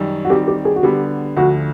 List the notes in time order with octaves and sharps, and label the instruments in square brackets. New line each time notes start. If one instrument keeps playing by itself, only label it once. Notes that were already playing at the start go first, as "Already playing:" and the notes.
Already playing: [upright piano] F#2 D#3 G3
[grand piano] F#4
[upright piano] D#3 G3 C4 [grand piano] G4
[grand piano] G4
G#4
F#4
[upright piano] D3 G3 B3 [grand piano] G4
[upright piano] D2 D3 F3 [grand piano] F#4